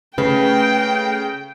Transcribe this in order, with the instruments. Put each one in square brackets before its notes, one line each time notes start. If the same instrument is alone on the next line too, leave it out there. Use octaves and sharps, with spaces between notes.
[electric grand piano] C#3 [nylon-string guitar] A3 B4 [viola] G5